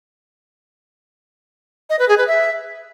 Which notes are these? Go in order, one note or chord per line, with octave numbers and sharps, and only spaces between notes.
D#5
B4
G#4
B4
E5